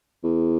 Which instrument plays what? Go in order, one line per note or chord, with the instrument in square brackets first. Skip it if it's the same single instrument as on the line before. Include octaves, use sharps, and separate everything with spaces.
[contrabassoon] E2